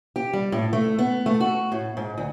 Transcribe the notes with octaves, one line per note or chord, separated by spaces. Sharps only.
G4
G3
A2
A3
B3
A3
F#4
A2
G#2
D2